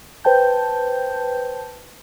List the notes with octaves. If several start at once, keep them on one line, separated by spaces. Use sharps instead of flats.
B4 C5 G5 A5 G6